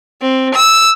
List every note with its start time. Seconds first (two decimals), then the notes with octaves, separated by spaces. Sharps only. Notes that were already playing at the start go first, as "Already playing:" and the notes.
0.22 C4
0.55 E6